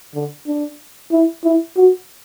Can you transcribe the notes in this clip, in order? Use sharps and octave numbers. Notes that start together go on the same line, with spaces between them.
D3
D4
E4
E4
F#4